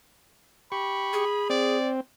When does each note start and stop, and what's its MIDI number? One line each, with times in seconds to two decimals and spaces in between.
0.72 1.25 67
0.72 1.47 83
0.72 1.25 85
1.13 1.77 68
1.49 2.01 60
1.49 1.92 74